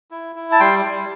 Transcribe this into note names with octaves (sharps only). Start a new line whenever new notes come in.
E4
E4
A5
G3 G5 C6
G3